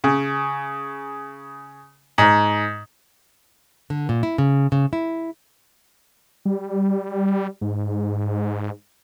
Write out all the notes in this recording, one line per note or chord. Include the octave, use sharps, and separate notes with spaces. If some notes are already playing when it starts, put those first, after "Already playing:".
C#3
G#2
D3
A#2
E4
C#3
C#3
E4
G3
G#2